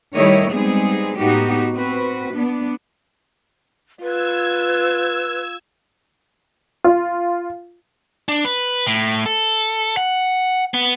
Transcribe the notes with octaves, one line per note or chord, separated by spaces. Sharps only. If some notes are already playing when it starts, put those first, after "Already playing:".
D#3 G3 A3 E4 C#5 D#5
G3 G#3 B3 C4 D#4 G#4
A2 B3 D#4 F#4 G4
C4 F#4 B4
B3 D4
F4 B4 E6 G#6
F4
D4
B4
A2
A4
F#5
B3